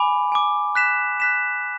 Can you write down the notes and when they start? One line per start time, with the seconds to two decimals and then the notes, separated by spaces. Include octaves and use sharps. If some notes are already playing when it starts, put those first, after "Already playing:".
Already playing: G#5 B5 D6
0.32 G#5 B5 D6
0.75 F#6 B6 E7
1.20 F#6 B6 E7